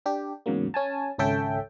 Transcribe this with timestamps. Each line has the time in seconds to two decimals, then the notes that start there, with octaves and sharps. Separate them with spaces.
0.06 D4 G4
0.46 E2 G#2 C#3 F#3 A#3
0.74 C#4 G#5 A5
1.18 G#1 C#2 C#4 A4 E5 G5